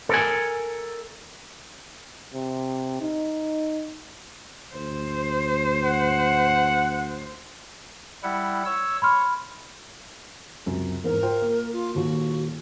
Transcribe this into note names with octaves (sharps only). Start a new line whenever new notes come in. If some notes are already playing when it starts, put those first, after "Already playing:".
A4 A#4 G#5
C3
D#4
D2 C5
F#5
G3 E4 F#5
C#5 E6
C#5 B5 C6 F6
C#2 F#2 C3
E2 G#2 A#4
F4 C5 G5
A#3
F4
D#1 D#2 F4 F#4